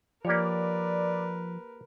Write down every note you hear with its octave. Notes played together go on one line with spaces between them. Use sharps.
F3 A#3 G4 A#4 B4 C#5 D5